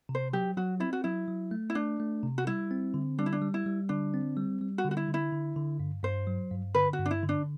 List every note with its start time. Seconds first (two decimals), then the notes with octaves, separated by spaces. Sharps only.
0.09 C3
0.15 C5
0.33 F#3 G4
0.57 F#3 F#4
0.80 C4 E4
0.93 F#4
1.04 F#3 E4
1.28 F#3
1.51 A3
1.70 E4
1.75 A3 D4
2.00 A3
2.23 C3
2.38 F#4
2.47 G3 E4
2.71 C4
2.94 D3
3.19 G3 D4
3.26 E4
3.33 D4
3.41 G3
3.54 E4
3.66 G3
3.89 D3 D4
4.14 C4
4.37 G3
4.61 G3
4.78 F#4
4.85 D3
4.91 F#4
4.97 E4
5.09 D3
5.14 E4
5.33 D3
5.56 D3
5.80 G2
6.03 G2 C5
6.27 F#3
6.51 G2
6.75 D3 B4
6.93 F#4
6.99 G2
7.06 D4
7.11 E4
7.23 D3
7.29 D4